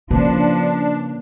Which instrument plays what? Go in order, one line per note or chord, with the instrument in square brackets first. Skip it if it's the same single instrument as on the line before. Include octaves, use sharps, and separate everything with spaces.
[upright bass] C#3 [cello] F3 [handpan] A#3 B4 [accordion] D4